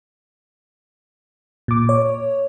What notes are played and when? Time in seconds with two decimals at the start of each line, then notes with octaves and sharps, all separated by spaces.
1.68 A#2 D6
1.89 C#5